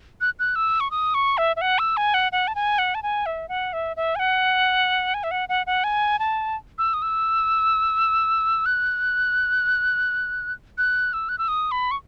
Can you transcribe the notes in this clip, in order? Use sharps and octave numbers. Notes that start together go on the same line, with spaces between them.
F#6
F#6
E6
C#6
D#6
C#6
E5
E5
F#5
E6
G#5
F#5
F#5
A5
G#5
F#5
A5
G#5
E5
F#5
E5
E5
G#5
F#5
G#5
E5
F#5
F#5
F#5
G#5
A5
E6
D#6
E6
F#6
F#6
E6
F#6
E6
D#6
B5
C#6